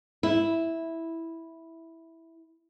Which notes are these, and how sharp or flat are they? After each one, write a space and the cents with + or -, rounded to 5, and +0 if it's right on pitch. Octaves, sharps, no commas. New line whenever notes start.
E4 -5